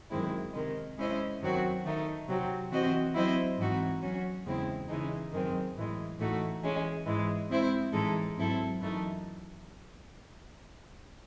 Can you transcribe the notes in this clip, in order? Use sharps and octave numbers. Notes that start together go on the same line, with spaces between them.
F#2 D#3 G#3 C4 E4
C3 D#3 G#3
G#3 C#4 E4 C5 D#5
F#2 D#3 F#3 C4 F#4
D#3 A3 D#4
C3 F#3 C4
E3 C4 F#4 C5 D#5
F#3 C4 E4 C5 D#5
G#2 E3 C4 D#4 F#4
F#3 C#4 F#4
E2 C#3 G#3 C4 E4
C#3 E3 G#3 D#4
F#2 D#3 G#3 C4
A2 E3 G#3
A2 E3 A3 D#4 F#4
E3 G#3 C#4
G#2 E3 G#3
G#3 C4 E4 C5
A2 E3 G#3 D#4 A4
G#2 F#3 C4 E4 A4
F#2 E3 A3 D#4